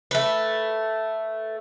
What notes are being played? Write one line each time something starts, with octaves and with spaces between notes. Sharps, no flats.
A3 B4